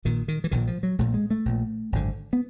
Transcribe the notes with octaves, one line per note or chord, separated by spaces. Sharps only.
A#1 A#2 D#3
D#3
E3
A#1 A#2 D#3
F3
F#3
A#1 A#2 A3
G#3
A3
A#1 A#2
G#1 F#2 D3
B3